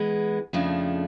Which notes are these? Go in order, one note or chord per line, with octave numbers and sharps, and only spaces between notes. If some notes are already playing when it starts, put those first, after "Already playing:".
Already playing: E3 G#3 B3
F2 C#3 F3 A3 D4